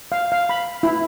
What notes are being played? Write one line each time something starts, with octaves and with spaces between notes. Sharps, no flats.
F5
F5
B5
E4